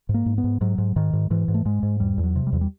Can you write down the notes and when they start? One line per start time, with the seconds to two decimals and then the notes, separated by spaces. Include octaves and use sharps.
0.09 G#2
0.14 A#3
0.26 G#2
0.38 B3
0.44 G#2
0.61 G#2 F#3
0.78 G#2
0.96 G#2 D#3
1.13 G#2
1.30 G#2 E3
1.48 G#2
1.54 A3
1.65 G#2 G#3
1.83 G#2
2.00 E2 G3
2.18 E2
2.24 F#3
2.36 C3
2.47 G3
2.53 E2 F#3
2.61 G3